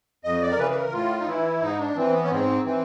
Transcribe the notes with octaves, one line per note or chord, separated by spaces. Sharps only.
F2 D#5
D5
A#4
C#3 E3 B4
B4
A#4
A2 F4
D#4
E3 E4
G#2 D#4
D4
E3 C4
B3
C#4
G#2 C4
E3 C4